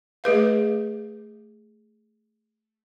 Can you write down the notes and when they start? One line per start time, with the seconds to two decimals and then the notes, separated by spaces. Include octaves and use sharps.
0.24 A3 G#4 B4 F5